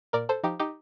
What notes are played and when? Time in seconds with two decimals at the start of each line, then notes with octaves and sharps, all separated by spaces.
0.13 A#2 A#4 D5
0.29 A4 C5
0.43 F3 D#4 G4
0.60 D#4 G4